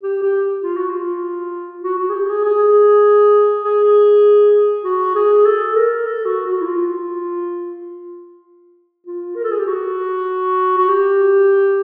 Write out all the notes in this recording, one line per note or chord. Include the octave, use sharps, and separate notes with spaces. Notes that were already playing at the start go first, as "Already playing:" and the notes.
G4
G4
F4
F#4
F4
F#4
F#4
G#4
G4
G#4
G#4
G#4
F#4
G#4
A4
A#4
A4
F#4
F#4
E4
F4
F4
A#4
A4
G#4
G4
F#4
F#4
G4